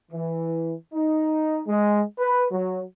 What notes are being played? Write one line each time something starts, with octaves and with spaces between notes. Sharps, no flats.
E3
D#4
G#3
B4
F#3